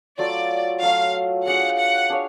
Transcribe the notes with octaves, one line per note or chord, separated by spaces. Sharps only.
F#3 A3 F4 D5
F#3 A3 F4 F5
D4 G#4 C#5 F5 F#5
F#5
D4 G#4 C#5 F5